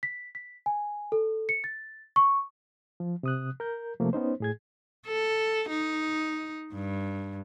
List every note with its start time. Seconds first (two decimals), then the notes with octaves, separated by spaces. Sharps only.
0.03 B6
0.35 B6
0.66 G#5
1.12 A4
1.49 C#7
1.64 A6
2.16 C#6
3.00 F3
3.23 C3 D#6 F#6
3.60 A#4 G6
4.00 C3 F3 A3 A#3
4.13 B3 C#4 D#4 C5
4.40 A2 G#4 G#6
5.06 A4
5.69 D#4
6.74 G2